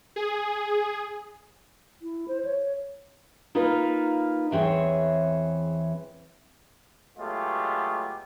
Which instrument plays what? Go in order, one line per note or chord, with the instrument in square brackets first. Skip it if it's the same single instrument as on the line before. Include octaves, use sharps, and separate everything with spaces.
[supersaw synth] G#4
[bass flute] E4
C5
C#5
[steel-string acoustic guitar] A#3 D#4 F4 B4
E2 E3 C4 G#4 C#5
[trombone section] F#3 G#3 A3 B3 F4 G4